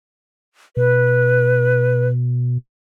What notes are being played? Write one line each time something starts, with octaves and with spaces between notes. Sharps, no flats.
B2 B4